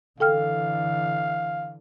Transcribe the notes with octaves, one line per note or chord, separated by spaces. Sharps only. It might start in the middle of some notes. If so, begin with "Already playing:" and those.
D3 E3 A4 F5 G5 F6